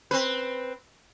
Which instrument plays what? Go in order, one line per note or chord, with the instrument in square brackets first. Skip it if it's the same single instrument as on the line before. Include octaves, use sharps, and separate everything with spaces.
[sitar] C4 B4